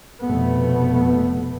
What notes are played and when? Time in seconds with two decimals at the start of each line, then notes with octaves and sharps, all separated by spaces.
0.23 F1 B2 A3 B3